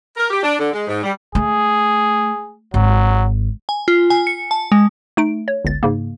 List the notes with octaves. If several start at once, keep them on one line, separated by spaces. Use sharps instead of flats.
A#4
G4
D4
D3
G#3
G#2
G3
A3 G#4
G#1 F#3
G#5
F4
G#5
C#7
A5
G#3
A3 D#4 D7
C#5
G1 C#2 A6
G#2 C#3 A#3